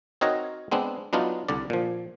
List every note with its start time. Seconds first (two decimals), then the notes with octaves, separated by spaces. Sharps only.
0.21 C4 D#4 F#4 A#4 C#5 D#5
0.71 G#3 B3 C4 D4
1.13 F#3 B3 D4 D#4 F4
1.49 C2 D3 D5
1.70 A#2 F3